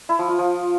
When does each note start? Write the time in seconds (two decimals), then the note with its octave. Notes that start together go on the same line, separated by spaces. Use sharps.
0.09 E4
0.19 F3
0.29 F4
0.39 F3